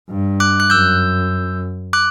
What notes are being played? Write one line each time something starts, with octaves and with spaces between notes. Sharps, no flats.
G2
D6 F#6
F#6
F#2 E6 G6
D6 F#6